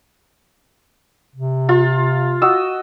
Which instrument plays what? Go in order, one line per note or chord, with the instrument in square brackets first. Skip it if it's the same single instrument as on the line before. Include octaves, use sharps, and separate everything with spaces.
[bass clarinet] C3
[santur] F4
F#4 D#5 E6